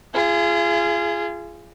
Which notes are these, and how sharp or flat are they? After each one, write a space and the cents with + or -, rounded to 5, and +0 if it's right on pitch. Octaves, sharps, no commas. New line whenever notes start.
F4 -35 G#4 +0